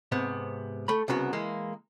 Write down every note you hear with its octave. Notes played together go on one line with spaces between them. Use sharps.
G#2 C3 B3
A3 B5
C2 C#3 B3 F#4
E3 G#3 A#3